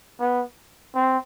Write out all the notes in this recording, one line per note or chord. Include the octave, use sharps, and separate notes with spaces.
B3
C4